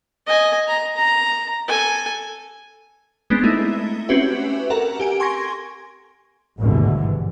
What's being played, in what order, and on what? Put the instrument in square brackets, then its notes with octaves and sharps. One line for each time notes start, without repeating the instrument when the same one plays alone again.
[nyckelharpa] D#5 G#5
A#5
A#5
A4 G#5
[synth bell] G#3 B3 C4 D4
A3 D#4 E4
C4 C#4 F#4 G4 B4 E5
A4 A#4 F#5 A#5
G4 G#5 D7
G#5 C6 C#6 G#6 A#6
[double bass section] G#1 D2 G2 B2 D3 E3